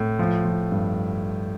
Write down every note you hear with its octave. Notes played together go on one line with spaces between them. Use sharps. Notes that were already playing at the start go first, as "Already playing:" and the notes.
Already playing: A2
F3
F3
G2